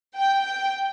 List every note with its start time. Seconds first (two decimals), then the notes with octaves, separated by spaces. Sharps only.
0.16 G5
0.44 G5